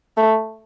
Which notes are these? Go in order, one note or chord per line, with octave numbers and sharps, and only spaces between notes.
A3